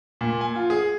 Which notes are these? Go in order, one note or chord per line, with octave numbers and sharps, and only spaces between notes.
A#2
G#5
F4
G#4